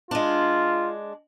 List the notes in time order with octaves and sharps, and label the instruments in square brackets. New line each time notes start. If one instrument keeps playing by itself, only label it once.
[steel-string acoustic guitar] G#3 D4 [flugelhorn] F4